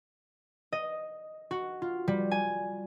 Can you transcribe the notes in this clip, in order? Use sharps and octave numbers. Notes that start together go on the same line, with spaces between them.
D#5
F#4
F4
G3
G#5